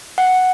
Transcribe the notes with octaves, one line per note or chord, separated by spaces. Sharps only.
F#5